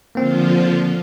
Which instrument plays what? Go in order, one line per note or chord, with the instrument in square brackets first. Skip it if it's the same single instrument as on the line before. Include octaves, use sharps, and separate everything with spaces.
[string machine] D3 F3 F4 [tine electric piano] A#3 C4